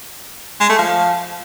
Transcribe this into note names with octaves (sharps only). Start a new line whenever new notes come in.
G#3
A3
F3